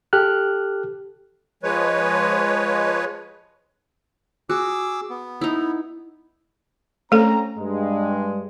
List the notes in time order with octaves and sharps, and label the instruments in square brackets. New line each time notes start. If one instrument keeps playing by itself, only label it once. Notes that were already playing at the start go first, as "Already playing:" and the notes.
[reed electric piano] G4 A4 F6 F#6
[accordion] F3 G#3 B4 C#5
[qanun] F#4 [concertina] G#4 D6 E6
[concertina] B3
[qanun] D#4 E4
[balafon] A3 A4 [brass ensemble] C4 C#4 A#5
[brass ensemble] G2 G#3